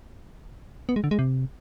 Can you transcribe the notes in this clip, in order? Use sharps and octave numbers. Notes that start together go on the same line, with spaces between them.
B3
G#3
D3
G#3
C3